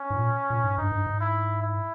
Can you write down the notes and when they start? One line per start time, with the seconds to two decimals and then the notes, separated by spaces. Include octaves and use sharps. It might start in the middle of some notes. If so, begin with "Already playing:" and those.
Already playing: C#4
0.10 G#2
0.16 A#2
0.50 A#2
0.64 G#2
0.78 G2 D#4
0.92 G2
1.06 G#2
1.21 E4
1.62 E4